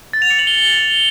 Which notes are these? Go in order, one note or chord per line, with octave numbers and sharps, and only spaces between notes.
A6
F7
C#7
F#7
G7